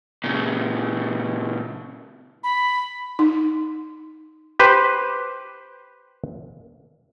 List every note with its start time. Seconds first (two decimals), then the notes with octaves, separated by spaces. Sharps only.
0.24 A#2 C#3
2.43 B5
3.19 D#4
4.59 G4 B4 C5